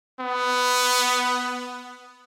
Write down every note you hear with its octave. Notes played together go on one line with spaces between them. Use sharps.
B3